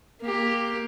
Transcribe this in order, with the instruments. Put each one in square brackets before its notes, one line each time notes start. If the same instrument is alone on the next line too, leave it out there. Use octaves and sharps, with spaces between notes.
[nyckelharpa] A#3 G4